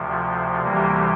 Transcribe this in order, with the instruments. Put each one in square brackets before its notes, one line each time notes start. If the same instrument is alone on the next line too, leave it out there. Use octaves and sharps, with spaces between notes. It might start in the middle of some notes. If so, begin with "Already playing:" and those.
Already playing: [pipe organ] D2 C3 F3
D2 C3 E3 G3 A#3